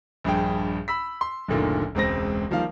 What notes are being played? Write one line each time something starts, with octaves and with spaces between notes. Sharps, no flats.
A#1 G2 G#4 G5
B5 E6 B6
C6
F#1 D2 A#2 D3 D#3
E1 C#2 C4 A#6
D#3 F3 G3 A#3 F5